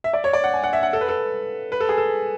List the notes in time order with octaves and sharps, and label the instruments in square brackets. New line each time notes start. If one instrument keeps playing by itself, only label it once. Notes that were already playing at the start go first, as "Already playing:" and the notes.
[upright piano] E5
D5
C#5
D5
F#5
G#5
F#5
E5
F#5
A4
B4
A4
B4
A4
G#4
A4